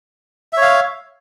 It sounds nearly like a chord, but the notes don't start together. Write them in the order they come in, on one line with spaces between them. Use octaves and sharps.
E5 C#5 F5